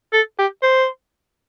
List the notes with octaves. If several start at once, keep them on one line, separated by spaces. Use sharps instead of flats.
A4
G4
C5